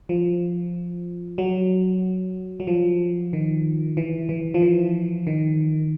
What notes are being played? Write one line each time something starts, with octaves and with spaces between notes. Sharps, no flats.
F3
F#3
F#3
F3
D#3
E3
E3
F3
E3
D#3